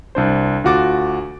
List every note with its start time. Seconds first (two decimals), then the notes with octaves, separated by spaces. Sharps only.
0.15 C2 D4 C5
0.64 D2 F4 F#4 D6 A6